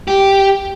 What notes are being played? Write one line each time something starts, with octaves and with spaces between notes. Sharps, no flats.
G4